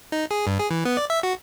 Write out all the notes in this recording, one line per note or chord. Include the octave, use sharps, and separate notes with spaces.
D#4
G#4
G2
G#4
E3
B3
D5
E5
F#4